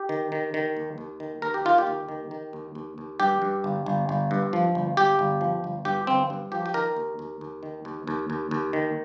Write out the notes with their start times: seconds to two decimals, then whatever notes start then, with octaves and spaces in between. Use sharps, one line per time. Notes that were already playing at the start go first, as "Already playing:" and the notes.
Already playing: G4
0.09 D#3
0.32 D#3
0.54 D#3
0.77 D#2
0.98 D#2
1.20 D#3
1.42 D#2 A#4
1.54 G4
1.65 D#3 F4
1.78 G4
1.87 D#2
2.08 D#3
2.31 D#3
2.53 D#2
2.75 D#2
2.98 D#2
3.20 G2 G4
3.42 G2
3.64 G1
3.86 G1
4.09 G1
4.31 G2
4.53 F3
4.75 G1
4.97 G1 G4
5.19 G1
5.41 F3
5.64 G1
5.85 G2 G4
6.07 G1 C4
6.30 G2
6.52 F3 G4
6.66 G4
6.74 D#3 A#4
6.97 D#2
7.19 D#2
7.41 D#2
7.63 D#3
7.85 D#2
8.07 D#2
8.30 D#2
8.51 D#2
8.73 D#3